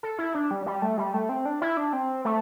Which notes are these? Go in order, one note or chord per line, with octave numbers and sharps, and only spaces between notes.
A4
E4
D4
G3
G3
A3
G3
A3
C4
D4
E4
D4
C4
A3